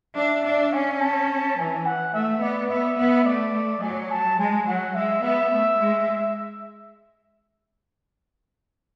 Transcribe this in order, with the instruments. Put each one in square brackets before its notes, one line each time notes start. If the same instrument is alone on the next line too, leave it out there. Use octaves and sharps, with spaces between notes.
[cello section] D4 [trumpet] E5
[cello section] D4
[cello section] C#4 [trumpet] G#5
[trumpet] A5
[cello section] E3 [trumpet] G#5
[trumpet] F#5
[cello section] A3 [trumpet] E5
[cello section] B3 [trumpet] D5
[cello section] B3 [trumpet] E5
[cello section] B3
[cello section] A3 [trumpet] D5
[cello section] F#3 [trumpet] G#5
[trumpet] A5
[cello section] G#3 [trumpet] G#5
[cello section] F#3 [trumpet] F#5
[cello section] G#3 [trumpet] E5
[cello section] B3 [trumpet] E5
[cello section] A3
G#3